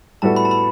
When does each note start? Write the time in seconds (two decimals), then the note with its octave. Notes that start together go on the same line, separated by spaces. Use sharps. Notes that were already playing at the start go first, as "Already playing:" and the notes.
0.22 A2 G3 B3 F#4 A4 A5
0.36 B5
0.45 A5
0.51 B5